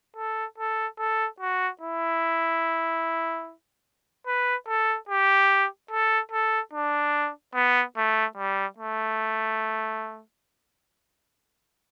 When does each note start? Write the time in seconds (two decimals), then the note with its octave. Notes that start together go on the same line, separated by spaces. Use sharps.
0.16 A4
0.58 A4
0.98 A4
1.40 F#4
1.81 E4
4.27 B4
4.68 A4
5.09 G4
5.91 A4
6.31 A4
6.73 D4
7.54 B3
7.97 A3
8.37 G3
8.78 A3